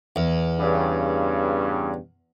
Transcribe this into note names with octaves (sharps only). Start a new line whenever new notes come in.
E2
G2 C#3